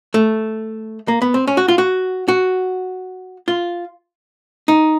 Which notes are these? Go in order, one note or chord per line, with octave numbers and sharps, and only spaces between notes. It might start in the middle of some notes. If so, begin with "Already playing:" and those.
A3
A#3
B3
C4
C#4
F#4
F4
F#4
F#4
F4
D#4